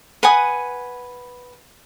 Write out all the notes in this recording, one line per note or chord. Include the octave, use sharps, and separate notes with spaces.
B4 F#5 G#5 D#6